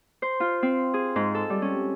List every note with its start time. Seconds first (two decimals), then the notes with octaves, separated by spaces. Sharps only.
0.22 C5
0.40 F4
0.63 C4
0.94 G#4
1.16 G#2
1.35 A4
1.50 G3
1.62 C#4